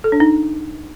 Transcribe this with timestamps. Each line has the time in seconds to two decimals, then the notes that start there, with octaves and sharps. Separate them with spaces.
0.04 A4
0.12 D4
0.20 D#4